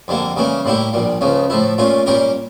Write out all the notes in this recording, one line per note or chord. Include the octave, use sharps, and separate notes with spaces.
F2 D3 G3 A#3
C#3 E3 G3 A#3 C#4
A2 G3 A#3 E4 G4
A#1 A#2 G3
C#2 C#3 F3 C#4
A2 F3 A3 E4
A#2 A3 C#4 F4
A#2 G3 C#4 G4 A#4